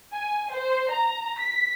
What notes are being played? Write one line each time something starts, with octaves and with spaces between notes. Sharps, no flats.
G#5
C5
A#5
B6